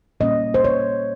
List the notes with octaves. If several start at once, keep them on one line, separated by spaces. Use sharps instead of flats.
A#2 G3 A#3 C#4 D#5
C5
C#5